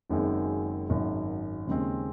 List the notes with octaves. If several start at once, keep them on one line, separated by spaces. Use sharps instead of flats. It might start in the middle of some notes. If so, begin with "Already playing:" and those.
F#1 F#2 D#3 G#3 C4
G#1 F#2 D#3
D#2 C#3 G#3 C4